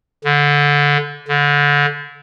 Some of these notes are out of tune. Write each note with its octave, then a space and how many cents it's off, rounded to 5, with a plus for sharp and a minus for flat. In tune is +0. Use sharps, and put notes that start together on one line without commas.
D3 -20
D3 -25